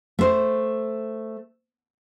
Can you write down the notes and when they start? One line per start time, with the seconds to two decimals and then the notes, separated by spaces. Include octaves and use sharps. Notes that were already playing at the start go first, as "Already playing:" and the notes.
0.19 A3 C5